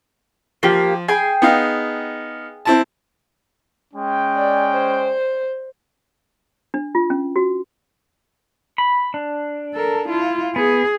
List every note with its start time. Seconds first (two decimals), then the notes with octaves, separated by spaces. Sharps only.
0.63 F3 A#3 G4
1.08 G#4 G5 G#5
1.42 B3 D#4 F5
2.65 C4 E4 A5
3.94 G#3 C#4 G5
4.37 D5
4.73 C5
6.74 D4
6.95 F4
7.10 C#4
7.36 F#4
8.78 B5
9.14 D4
9.74 A4 A#4
10.08 E4 F4
10.56 B3 G#4